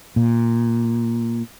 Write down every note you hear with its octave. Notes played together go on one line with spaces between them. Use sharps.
A#2